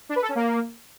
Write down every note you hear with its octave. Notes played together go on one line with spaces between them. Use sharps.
D4
B4
A4
C#4
A#3